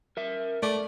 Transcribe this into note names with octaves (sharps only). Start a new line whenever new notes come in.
A#4 E5
A3 D5